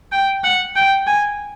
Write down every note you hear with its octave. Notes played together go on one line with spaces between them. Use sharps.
G5
F#5
G5
G#5